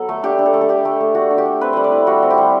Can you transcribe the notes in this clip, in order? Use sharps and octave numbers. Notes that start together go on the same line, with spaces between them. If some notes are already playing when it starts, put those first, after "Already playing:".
Already playing: F#3 B3 A4
A3
D4 G4
D4
A4
A3
A4
D4 G4
A3
A3
D4 F#4
D4
G4
A3
C4 B4
G3 C5
D5
E4
G3 F#4
C4
G4
G3